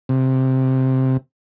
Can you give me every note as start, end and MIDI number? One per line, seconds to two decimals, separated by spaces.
0.09 1.17 48